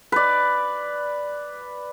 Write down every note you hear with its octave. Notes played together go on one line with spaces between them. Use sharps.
B4 D5